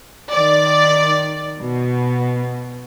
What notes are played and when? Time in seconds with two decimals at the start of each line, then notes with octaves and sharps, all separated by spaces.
0.32 D#3 D5
1.60 B2